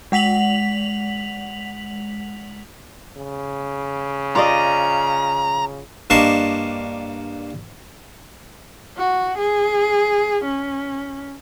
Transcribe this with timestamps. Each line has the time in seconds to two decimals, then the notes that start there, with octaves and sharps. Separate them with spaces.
0.12 G#3 F#5 B6 F7 F#7
3.19 C#3
4.36 F4 D5 D#5 A#5
6.10 G2 A#3 D4 C5 D#5 C#6
8.98 F#4
9.38 G#4
10.44 C#4